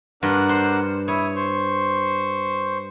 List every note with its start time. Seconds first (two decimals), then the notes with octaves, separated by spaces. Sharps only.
0.23 G2 D4 A#4 F#5
0.49 C5
1.08 E4 C#5 D#6
1.36 C5 C#6